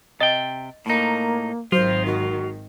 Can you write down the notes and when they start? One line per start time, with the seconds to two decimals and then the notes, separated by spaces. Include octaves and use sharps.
0.20 C3 D#5 G5 A6
0.86 A2 A#3 D#4
1.72 G#1 D#3 F#3 F4 C5
2.06 F#4